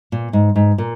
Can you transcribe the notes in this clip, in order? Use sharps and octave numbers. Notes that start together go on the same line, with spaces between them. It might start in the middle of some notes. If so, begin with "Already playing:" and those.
A#2
G#2
G#2
A#2